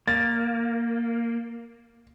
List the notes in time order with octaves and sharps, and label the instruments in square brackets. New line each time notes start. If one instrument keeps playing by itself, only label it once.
[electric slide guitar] A#3 [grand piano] A6